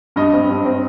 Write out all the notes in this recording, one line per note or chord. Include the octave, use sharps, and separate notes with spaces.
G2 D#5
C4
G2
C4